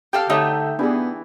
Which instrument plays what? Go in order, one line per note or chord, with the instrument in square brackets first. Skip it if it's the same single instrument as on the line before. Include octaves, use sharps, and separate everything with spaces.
[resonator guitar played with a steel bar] G4 A4 F5 [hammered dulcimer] G5
[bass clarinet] D3 [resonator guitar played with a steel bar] A3 D#4 E5 [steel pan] G4 C#5
[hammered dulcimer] E3 [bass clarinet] B3 [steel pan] D4 G4 G#4